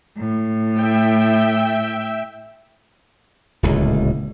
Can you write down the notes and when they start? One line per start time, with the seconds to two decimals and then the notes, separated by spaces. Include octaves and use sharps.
0.19 A2
0.79 E5 G5
3.63 D1 C#2 A#2